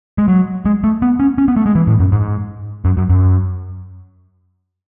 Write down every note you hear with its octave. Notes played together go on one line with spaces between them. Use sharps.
G#3
F#3
G#3
A3
B3
C#4
C#4
B3
A3
G#3
E3
A2
F#2
G#2
F#2
F#2
F#2